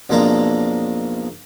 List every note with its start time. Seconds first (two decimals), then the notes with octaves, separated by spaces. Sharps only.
0.09 B1 F2 G#3 A#3 D4 A#5